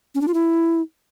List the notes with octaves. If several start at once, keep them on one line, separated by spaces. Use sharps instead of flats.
C#4
D4
F4
E4